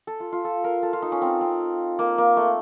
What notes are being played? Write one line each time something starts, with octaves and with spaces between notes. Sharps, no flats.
A4
F4
F4
A4
A#4
A4
F4
D#4
C#4
C4
C4
A#3
A#3
A3